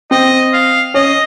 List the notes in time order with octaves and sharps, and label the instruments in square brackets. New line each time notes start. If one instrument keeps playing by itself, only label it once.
[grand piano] C4 [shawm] D#5
[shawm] F5
[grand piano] C#4 [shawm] D#5